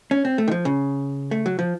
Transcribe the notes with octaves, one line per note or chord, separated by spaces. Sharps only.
C#4
C4
A3
D#3
F3
C#3
A3
F#3
F3